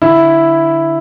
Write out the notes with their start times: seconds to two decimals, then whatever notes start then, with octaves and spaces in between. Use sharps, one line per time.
0.02 D3 E4